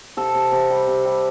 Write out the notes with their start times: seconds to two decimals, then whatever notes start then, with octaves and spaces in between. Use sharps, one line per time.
0.17 C3 A4
0.34 C3
0.52 C3
0.70 G3
0.87 C3
1.05 G3